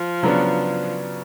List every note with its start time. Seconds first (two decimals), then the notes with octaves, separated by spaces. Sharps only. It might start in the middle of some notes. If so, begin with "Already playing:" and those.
Already playing: F3
0.23 C#3 F#3 B3 D4